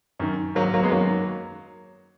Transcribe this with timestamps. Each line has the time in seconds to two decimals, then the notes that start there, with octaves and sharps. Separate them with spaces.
0.19 F#2 D#3
0.55 G#2 D#3 F#3 A#3
0.74 F#3 A#3
0.83 G#3 B3
0.92 F#2 D#3 F#3 A#3